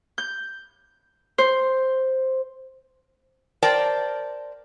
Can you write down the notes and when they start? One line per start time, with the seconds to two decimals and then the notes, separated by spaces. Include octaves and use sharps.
0.18 G6
1.38 C5
3.62 A#4 C5 D5 G5 A5